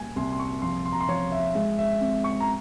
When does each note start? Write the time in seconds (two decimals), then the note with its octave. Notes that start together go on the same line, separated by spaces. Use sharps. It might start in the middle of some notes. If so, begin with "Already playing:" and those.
Already playing: A#2 G3 G#5
0.16 C2 C6
0.32 C6
0.39 C#6
0.62 F3 C6
0.85 C6
0.92 A#5
1.00 C6
1.09 F3 C#5
1.32 E5
1.55 G#3 E5
1.78 E5
2.01 C4
2.24 C#6
2.40 A#5